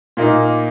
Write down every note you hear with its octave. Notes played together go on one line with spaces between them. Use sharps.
A#2 A#3 D#4